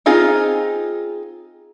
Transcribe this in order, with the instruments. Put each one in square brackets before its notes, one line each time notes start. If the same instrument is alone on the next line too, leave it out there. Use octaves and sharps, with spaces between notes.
[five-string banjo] C4 D#4 F4 G#4